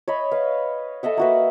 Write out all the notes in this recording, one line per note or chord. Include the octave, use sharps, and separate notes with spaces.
C#5 D#5 B5
B4 F5
A4 D#5 E5 F#5
A#3 F#4 B4